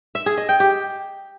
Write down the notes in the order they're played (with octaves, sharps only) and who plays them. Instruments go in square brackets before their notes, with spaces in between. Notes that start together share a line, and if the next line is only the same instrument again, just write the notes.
[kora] E5
G#4
D#5
G5
G4